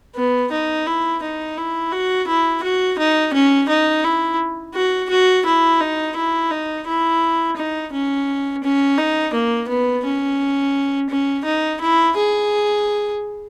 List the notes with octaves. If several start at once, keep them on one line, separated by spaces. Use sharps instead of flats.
B3
D#4
E4
D#4
E4
F#4
E4
F#4
D#4
C#4
D#4
E4
F#4
F#4
E4
D#4
E4
D#4
E4
D#4
C#4
C#4
D#4
A#3
B3
C#4
C#4
D#4
E4
G#4